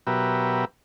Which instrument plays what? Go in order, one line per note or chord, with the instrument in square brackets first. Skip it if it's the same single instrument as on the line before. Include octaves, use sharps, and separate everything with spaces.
[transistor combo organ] B2 F#3 G4 A#4 B4 E5